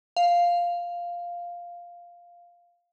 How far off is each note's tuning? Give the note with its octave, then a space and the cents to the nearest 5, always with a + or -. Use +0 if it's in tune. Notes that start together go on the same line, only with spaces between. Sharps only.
F5 +0